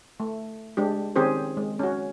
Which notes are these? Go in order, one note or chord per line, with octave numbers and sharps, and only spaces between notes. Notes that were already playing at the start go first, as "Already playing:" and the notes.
A3
G#3 D4 G4
D#3 C4 C#4 G4 G#4 C5
G#3
C#4 F#4